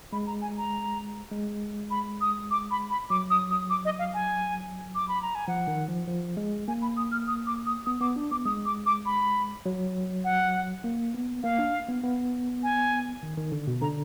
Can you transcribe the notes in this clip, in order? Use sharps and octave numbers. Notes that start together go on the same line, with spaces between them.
G#3 B5
A#5
G#5
A#5
G#3
B5
D#6
D6
B5
B5
F#3 D6
D#6
D#6
D6
D#5
F5
G#5
D6
B5
A#5
G#5
F3 F#5
D#3
F3
F3
G#3
A#3 G#5
B5
D#6
F6
D#6
D6
D#6
B3 D#6
B3 D6
D4
B3 D6
G#3 D#6
D6
D6
B5
F#3
F#5
A#3
B3
A#3 F5
D4
B3
B3
G#5
D#3
D#3
D3
B2
D3 A#5